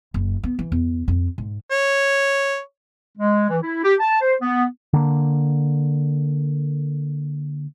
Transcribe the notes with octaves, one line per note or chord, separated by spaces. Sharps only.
F#1
B3
E3
E2
F2
G#2
C#5
G#3
E3
E4
G4
A5
C5
B3
D3 A#3